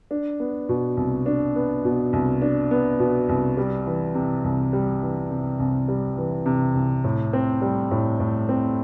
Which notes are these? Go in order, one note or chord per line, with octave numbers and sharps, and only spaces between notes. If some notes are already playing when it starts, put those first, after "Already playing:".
D4
B3
B2
C2
D4
B3
B2
C2
D4
B3
B2
C2
G3
E3
C3
C2
G3
E3
C3
C2
G3
E3
C3
C2
A2
C4
G3
A2
A2
C4